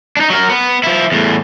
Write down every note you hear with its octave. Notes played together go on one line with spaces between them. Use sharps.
D4 D#4
F#3 A#4
B3
F3 E4
E2 A2